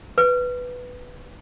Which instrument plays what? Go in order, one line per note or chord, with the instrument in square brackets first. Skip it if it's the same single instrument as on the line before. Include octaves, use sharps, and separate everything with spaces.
[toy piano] B4